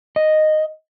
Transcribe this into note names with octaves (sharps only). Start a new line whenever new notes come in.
D#5